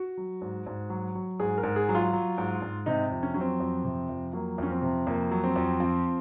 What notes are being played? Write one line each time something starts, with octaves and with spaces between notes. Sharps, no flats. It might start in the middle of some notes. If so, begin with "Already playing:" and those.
Already playing: F#4
F#3
G#2
G#2
F#3
F#3
G#2 G#4
A#4
G#2
G#4
F#3
F4
F#3
G#2
G#2
C3 D#4
F2
C#4
F#3 C#4
C4
F2
C3
F2
F#3 A#3
F2 C#4
C4
C3
F2 A#3
F#3
C4
F2
F3 C4